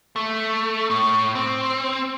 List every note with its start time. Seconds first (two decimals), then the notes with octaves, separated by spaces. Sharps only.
0.16 A3
0.90 A2
1.35 C4